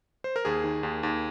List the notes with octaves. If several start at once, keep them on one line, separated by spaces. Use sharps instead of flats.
C5
A#4
D#2 G#4
D#3
D#2
D#2